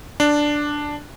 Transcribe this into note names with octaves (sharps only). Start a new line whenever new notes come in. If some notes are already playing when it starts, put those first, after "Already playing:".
D4